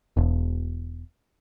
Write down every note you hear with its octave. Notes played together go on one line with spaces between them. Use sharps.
E1